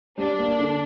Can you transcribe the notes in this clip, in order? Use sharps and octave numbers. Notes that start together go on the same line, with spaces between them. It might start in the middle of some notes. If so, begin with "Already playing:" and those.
G3 D4
A#3
D3